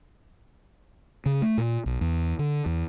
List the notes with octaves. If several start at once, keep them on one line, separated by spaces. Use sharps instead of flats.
C#3
A3
A#2
B1
E2
D3
E2